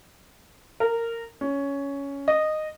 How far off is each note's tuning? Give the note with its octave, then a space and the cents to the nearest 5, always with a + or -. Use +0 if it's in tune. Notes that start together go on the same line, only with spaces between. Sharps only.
A#4 -15
C#4 +10
D#5 -10